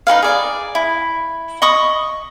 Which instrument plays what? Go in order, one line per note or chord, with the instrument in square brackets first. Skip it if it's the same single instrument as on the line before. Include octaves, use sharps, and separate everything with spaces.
[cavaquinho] D#4 F#4 B4 F5
G#4 D5
E4
D#5 B5 C#6 D#6